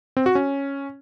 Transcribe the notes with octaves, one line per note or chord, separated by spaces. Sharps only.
C4
F#4
C#4